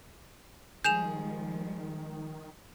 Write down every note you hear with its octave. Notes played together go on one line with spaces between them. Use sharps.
D#3 F3 G3 G#3 G#4 G6 E7 F7